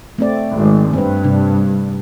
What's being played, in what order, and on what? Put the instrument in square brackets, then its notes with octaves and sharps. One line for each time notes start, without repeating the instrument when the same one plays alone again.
[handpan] A3 C4 D5
[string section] G#1
[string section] G2 [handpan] C4 B4
[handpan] C3 D4